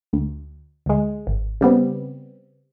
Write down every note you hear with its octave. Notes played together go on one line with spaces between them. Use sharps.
D2
D2 G#3
G#1
C#3 G3 B3 C4